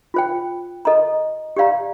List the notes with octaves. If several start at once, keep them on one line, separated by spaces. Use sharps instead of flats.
F4 C5 G5
A4 D#5 A#5
G4 D5 F5 A#5